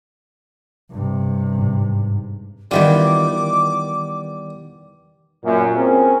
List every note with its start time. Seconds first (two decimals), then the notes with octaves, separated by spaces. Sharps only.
0.90 G2 C3
1.59 G#2
2.71 D#3 E3 G3 B3 F4 D6
5.44 F#2 A#2
5.75 C4 C#4 G#4 A#4